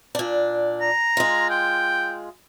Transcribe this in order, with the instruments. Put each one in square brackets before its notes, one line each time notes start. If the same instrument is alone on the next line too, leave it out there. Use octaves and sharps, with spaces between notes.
[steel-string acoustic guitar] A#2 D4
[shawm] A#5
[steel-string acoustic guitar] G#3 F4
[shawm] G5